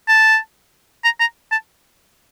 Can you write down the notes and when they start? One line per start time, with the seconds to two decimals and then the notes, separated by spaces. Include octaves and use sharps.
0.08 A5
1.04 A#5
1.20 A#5
1.52 A5